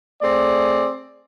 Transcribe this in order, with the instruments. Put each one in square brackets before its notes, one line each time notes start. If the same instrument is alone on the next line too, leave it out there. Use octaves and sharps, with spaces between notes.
[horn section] A3 C4 G#4 D5